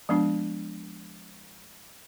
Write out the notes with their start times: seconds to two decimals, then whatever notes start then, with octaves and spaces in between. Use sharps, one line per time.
0.09 F3 G#3 B3 D4